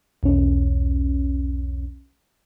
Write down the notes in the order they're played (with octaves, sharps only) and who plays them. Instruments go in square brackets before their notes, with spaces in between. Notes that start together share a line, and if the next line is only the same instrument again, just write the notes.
[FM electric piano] B1 E2 C#4